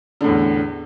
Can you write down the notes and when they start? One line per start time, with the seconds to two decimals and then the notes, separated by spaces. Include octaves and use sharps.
0.21 D3
0.24 A2
0.28 E2